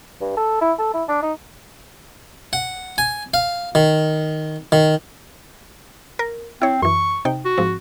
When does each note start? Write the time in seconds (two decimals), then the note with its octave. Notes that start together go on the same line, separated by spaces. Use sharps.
0.21 G2
0.37 A4
0.61 E4
0.79 A4
0.94 E4
1.08 D4
1.22 D#4
2.53 F#5
2.98 G#5
3.34 F5
3.75 D#3
4.72 D#3
6.19 A#4
6.62 C4 E4 C#5
6.82 F#2 E3 C#6
7.25 C3 D#4 G5
7.45 F#4
7.58 G#2 F3 C4